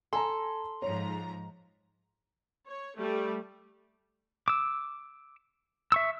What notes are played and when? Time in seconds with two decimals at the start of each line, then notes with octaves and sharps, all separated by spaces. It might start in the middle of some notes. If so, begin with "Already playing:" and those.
0.13 A4 G#5 A#5 C6
0.82 G#2 F3 C#5 A#5
2.66 C#5
2.97 G3 A3
4.48 D6 E6
5.92 E5 C#6 E6